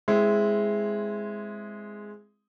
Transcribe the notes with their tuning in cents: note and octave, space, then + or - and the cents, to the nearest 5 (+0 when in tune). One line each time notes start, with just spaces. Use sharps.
G#3 +0 C4 +0 E4 +0